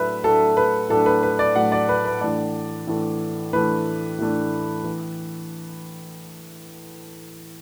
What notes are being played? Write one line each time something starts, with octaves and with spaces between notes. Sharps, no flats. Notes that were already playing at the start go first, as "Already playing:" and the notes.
Already playing: A2 F#3 A3 D4 B4 E5
A2 F#3 A3 D4 A4
B4
A2 F#3 A3 D4 A4
B4
B4
D5
A2 F#3 A3 D4 F#5
D5
B4
B4
A2 E3 A3 D4 D5
A2 E3 A3 D4
A2 E3 A3 D4 B4
A2 E3 A3 D4
E3